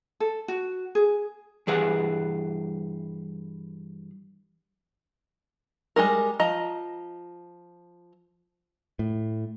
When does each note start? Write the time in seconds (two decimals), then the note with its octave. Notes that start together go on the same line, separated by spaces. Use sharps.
0.20 A4
0.48 F#4
0.95 G#4
1.67 G2 E3 G#4 B4 F#5
5.96 G3 G#3 D4 A#4
6.39 F3 D#5 A#5
8.99 A2